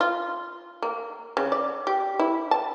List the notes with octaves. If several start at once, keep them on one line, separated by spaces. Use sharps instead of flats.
F4
A#3
C#3
D5
G4
E4
A5